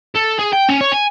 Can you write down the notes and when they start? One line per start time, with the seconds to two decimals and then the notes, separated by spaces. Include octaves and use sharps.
0.15 A4
0.39 G#4
0.53 G5
0.69 C#4
0.81 C#5
0.92 G#5